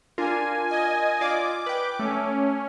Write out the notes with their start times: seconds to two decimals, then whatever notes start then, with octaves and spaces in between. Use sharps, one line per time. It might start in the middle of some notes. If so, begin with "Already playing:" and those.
0.18 D4 F4 A#4 G#5
0.68 D#5 G#5
1.21 F4 D5 D6
1.66 B4 G5
1.99 A3 C#4